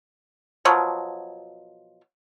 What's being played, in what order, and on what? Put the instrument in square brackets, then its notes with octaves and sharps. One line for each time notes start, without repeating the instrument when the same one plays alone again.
[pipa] B2 F3 F#3